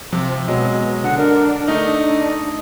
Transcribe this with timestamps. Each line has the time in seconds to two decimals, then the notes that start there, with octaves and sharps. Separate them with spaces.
0.13 C3 F3
0.48 B2 F#3 G#3 D#5
1.04 D3 F#5
1.18 D4 A#4
1.68 A3 D#4 D#5